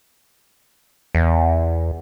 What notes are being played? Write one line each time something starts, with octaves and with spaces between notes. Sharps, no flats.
E2